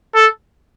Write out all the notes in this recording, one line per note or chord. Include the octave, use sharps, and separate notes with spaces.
A4